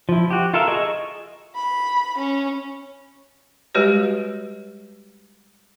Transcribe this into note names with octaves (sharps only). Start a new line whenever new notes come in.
F3 E4
F#4 G4
F4 A4 A#4 E5
G#4 D#5 C#6
B5
C#4
G3 G#3 F#4 G4 B4 C#5